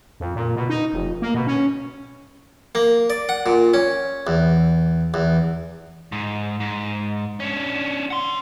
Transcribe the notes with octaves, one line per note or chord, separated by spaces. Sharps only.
F2
A#2
B2
D#4
F1
A#3
B2
C#4
A#3
D5
F#5
A#2
C#4
E2
E2
G#2
G#2
C#4 D4
F#5 C6